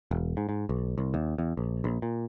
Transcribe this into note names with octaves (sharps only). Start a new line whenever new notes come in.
E1
G#2
G#2
B1
C2
D#2
E2
A#1
A#1
A#2